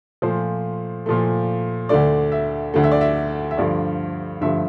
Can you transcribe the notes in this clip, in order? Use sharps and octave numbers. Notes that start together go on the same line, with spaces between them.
A#2 F3 A3 C5
A#2 F3 A3
D2 D3 A3 D5
E5
D2 D3 A3
E5
D5
E5
E5
G2 D3 F3 A3 D5
G2 D3 F3 A3 E5